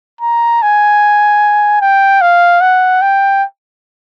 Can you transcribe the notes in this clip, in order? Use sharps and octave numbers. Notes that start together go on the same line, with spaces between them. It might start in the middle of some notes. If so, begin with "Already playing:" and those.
A#5
G#5
G5
F5
F#5
G5